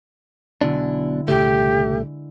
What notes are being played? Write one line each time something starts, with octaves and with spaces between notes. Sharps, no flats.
B1 B2 D3 G#3 D4 E4
C2 A#2 C#3 A3 G4